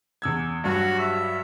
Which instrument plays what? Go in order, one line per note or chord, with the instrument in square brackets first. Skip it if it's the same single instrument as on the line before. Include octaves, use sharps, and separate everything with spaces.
[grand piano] E2 E6 G#6
[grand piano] G2 F#3 G3 [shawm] F#4
[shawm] E5